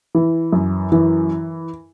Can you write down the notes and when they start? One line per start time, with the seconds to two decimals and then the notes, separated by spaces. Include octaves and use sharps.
0.15 E3
0.53 F#2
0.92 E3